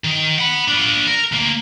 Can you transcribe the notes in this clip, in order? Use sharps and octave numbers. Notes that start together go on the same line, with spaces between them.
D#3
F#5 B5
D4 F4
A#4
D2 A#3